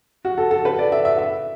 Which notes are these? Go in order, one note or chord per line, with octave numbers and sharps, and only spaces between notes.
F#4
A4
A4
B4
D5
E5
E5
E5